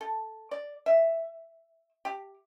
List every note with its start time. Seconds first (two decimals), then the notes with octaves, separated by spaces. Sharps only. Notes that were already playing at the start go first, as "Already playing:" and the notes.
0.01 A4
0.51 D5
0.86 E5
2.05 G4